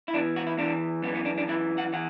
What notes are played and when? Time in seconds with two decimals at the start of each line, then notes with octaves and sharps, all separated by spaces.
0.08 E4
0.14 E2 E3 D4
0.36 F#4
0.47 E4
0.58 E2 E3 D4
1.03 F#2 B3
1.07 E3
1.15 B3
1.25 D4
1.37 D4
1.48 F#2 E3 E4
1.78 F#5
1.93 E3 F#5